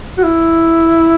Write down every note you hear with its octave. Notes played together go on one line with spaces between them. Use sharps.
F#4
E4